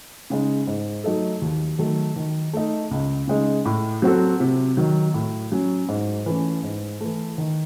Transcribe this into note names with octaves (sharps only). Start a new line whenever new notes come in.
C#3 G#3 D#4
G#2
F#3 A3 D#4 A4
D#2
D#3 F#3 A3
D#3
A3 D#4
C#2
C#3 G#3 D#4
A2
F#3 C4 F#4 A4
C3
D#3 F#3
A2
F#3 C#4
G#2
E3 A3 C#4
G#2
E3 A3
D#3